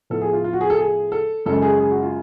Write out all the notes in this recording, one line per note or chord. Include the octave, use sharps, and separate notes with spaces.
A2 F3 B3 A4
G#4
F4
F4
F#4
G#4
A4
G#4
A4
F#2 C#3 G#3 A4
G#4
G#4
F#4
F4